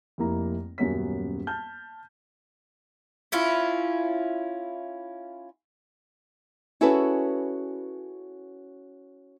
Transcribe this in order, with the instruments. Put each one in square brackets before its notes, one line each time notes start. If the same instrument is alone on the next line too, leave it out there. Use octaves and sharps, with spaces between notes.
[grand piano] F1 F2 A#3 E4 A#5
D#1 F#2 A#3 B3 C#4 B6
A5 F6 G6
[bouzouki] C#4 E4 F4
[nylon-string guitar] C#4 E4 F#4 G#4 A4 B4